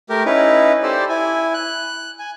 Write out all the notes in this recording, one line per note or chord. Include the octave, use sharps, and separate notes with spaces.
A3 G4 A#4
C#4 D#4 E4 B4
G4 A4 C5 D5
E4 G#5
F#6
G#5